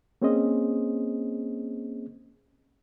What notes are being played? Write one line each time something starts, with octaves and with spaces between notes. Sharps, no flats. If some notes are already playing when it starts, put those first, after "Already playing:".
A#3 C4 C#4 G#4 C5 D#5